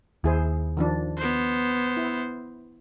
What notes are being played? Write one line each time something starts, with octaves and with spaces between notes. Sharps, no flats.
D#2 E4 G#4 C5
D#3 F3 D4
B3 C5
E4